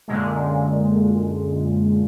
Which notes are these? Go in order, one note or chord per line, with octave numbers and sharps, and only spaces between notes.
F#2 A#2 D3 G#3